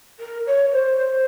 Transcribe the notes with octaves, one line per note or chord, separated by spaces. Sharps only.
A#4
C#5
C5